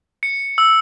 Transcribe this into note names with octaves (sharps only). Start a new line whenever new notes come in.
C#7
E6